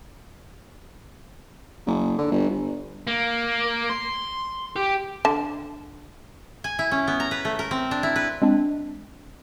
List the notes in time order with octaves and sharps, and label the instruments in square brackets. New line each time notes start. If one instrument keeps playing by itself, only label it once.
[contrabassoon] F#1
D3
G1
G1
[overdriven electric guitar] A#3
C6
G4
[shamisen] D3 A5
[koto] G#5
E4
C#4
B3
A#5
B4
A3
A#4
C4
D4
E4
B4
[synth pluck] G#3 C4 D4